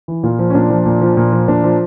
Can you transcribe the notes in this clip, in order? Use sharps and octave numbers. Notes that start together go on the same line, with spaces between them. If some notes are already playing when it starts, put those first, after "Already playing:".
E3
A#2 F4
F3
C#4
A#2 D4
F3
A#2
F3
A#2
F3
A#2 D4
F3